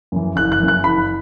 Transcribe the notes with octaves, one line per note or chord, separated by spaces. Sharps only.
F#2 E3
F#1 F#6
F#6
F#2 E3
F#6
F#1 B5